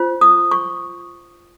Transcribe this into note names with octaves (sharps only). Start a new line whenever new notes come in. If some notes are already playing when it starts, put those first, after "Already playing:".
Already playing: F4 C5
D#6
C#6